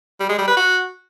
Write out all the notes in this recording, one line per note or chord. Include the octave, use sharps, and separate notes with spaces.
G3
G#3
G3
B4
F#4